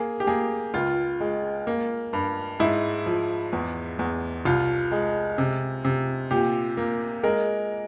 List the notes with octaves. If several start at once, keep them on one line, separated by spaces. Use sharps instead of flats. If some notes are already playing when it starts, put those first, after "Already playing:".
Already playing: A#3 G#4
G4
A#3 G#4
C#2 F4
G#3
A#3
G2
G#2 E4
F3
E2
E2
C2 F4
G#3
C3
C3
A#2 G4
A#3
G#3 A#4